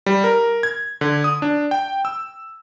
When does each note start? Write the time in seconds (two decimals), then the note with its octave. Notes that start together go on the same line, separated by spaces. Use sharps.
0.06 G3
0.24 A#4
0.63 G#6
1.01 D3
1.24 D#6
1.42 D4
1.71 G5
2.05 E6